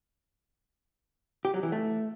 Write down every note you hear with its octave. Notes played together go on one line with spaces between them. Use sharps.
G4
F#3
E3
A3